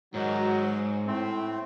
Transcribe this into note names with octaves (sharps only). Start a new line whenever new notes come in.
G#2 D#3 F#3 D#4 F#4
A2 A3 C4